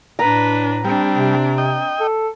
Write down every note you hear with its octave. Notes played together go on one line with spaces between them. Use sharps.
A2 D4 B4 A#5
G3 C4 D4
C3
D#5 G5
A4